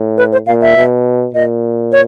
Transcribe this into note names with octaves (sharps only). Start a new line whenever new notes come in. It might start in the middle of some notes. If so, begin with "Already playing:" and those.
Already playing: A2
B4
C5
A#2 F5
E5
B2
A#2 D#5
C#5